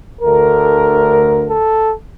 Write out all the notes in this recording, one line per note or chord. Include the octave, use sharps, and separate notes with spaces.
D2 D3 A3 A#4
A4